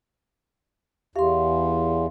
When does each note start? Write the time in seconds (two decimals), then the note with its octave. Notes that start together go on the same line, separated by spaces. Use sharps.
1.16 E2 G4 E5 F5 C6